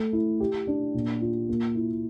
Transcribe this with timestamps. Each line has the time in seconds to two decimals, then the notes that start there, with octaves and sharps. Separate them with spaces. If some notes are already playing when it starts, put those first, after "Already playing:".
Already playing: A3
0.13 E4
0.40 G4
0.67 D4
0.94 A#2
1.22 F4
1.49 A#3
1.75 E4